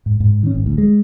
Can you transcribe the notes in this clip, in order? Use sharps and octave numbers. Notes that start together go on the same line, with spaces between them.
G#2
G#2
D#3 C#4
G#1
D2
G#3